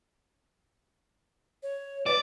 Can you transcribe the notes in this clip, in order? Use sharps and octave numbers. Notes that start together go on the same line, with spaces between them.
C#5
B4 D5